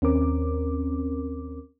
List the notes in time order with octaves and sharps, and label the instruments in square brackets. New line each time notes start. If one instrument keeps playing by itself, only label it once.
[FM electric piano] D#2 C4 C#4 A#4 D6